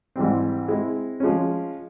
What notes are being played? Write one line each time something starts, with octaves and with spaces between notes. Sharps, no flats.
G#2 E3 G3 C4
G#3 C4 E4
F3 G#3 C#4